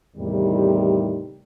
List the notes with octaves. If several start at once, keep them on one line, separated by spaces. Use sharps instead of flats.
E2 A2 C3 D#3 G3